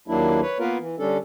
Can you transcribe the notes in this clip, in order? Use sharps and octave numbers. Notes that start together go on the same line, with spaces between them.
D#2 F#3 A#3 D4 E4
B4 C#5
A#3 B3 F4 A#4 B4
E3
D3 G3 C#4 D4 A4